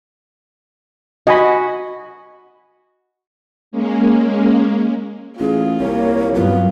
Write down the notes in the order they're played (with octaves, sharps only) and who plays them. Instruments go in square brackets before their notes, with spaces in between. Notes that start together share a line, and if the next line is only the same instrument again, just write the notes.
[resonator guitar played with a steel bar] F#4 [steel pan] D#5 G#5 B5
[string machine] G#3 A#3 C#4
[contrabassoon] A1 [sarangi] F4 [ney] G#4
[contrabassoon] C2 [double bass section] A#3 [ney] C#5
[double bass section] G2 F#3 [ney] B3 [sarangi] F4